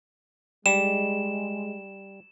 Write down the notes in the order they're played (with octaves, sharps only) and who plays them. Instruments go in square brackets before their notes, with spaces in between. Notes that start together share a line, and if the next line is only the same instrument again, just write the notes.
[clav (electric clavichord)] G3 [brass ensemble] G#3 [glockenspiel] E7